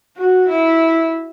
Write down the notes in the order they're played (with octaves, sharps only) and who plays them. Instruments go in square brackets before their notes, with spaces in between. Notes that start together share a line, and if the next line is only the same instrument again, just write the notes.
[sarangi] F#4
E4